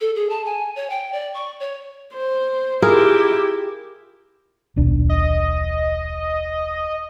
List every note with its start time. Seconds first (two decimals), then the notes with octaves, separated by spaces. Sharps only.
0.01 A4
0.16 G#4
0.29 A5
0.45 G#5
0.76 C#5
0.90 G5
1.13 D5
1.34 C#6
1.60 C#5
2.14 C5
2.82 E4 F4 G4 G#4 A#4
4.76 D#1 B1 D4
5.09 D#5